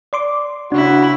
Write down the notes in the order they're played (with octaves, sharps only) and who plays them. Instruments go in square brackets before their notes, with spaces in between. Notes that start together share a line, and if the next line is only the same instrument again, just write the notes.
[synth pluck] D5 C6 D6
[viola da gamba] C#3 E4 [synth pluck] D4 [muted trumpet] F#4